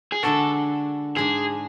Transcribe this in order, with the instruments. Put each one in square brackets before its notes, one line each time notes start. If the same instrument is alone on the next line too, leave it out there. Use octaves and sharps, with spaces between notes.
[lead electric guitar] G#4
[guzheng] D3 G#3 D4 F#4 [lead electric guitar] A4
[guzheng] G#2 G#3 D4 [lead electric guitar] G#4